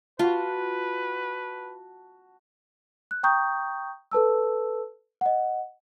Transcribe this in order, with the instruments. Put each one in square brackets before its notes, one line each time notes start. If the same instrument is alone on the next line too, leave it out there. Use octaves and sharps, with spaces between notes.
[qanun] F4 [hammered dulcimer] F#4 A5 [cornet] B4
[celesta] F#6
G5 A#5 C#6 D#6 G6
A4 B4 A5 E6
D#5 F#5